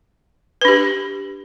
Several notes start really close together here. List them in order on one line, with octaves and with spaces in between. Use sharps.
B4 D4 G4